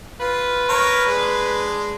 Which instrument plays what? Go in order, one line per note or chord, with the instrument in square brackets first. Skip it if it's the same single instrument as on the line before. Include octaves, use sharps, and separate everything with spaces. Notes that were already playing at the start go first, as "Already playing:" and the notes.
[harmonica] F4 [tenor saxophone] B4
[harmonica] A#4 C#5
G#3 D4